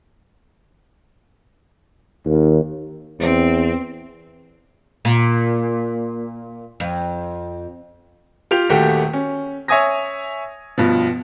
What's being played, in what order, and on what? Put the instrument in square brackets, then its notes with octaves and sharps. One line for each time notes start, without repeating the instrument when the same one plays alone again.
[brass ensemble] D#2
[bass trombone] E2 [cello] C4
[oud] A#2
F2
[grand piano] F4 G4 G5 F7
D#1 D#2 A3 F#4 G4 G5
C#4
C#5 E5 G#5 D#6 G#6 A#6
G2 B2 F3